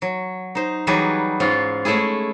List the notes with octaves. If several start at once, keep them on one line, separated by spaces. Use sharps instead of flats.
F#3
D#4 C5
E3 F#3 G3 D#4 G#4 B4
G#2 C#4 F4
G#3 A3 C#4 E4 G#4